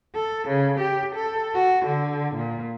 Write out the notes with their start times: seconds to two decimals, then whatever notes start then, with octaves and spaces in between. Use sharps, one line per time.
0.15 A4
0.49 C#3
0.80 G4
1.15 A4
1.54 F#4
1.86 D3
2.36 A#2